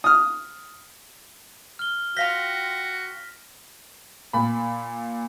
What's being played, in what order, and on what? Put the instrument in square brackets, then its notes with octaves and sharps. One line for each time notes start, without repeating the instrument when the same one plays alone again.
[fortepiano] D#6 F6
[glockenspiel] F6 G7
[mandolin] F4 F5 G5 [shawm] F#4 [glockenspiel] A#6 B6 G7
[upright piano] A#2 B5